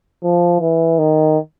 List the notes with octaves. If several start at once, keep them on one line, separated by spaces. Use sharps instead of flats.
F3
E3
D#3